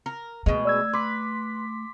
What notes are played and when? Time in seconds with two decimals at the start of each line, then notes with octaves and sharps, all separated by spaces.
0.06 A#4
0.46 B2 G#3 A3
0.65 D5 E6 G#6
0.93 B4 C6 D6 B6